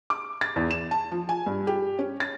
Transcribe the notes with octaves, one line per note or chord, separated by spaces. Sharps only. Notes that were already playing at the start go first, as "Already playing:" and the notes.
D6
A6
E2
E7
A5
F3
G#5
G2
G4
C#4
A6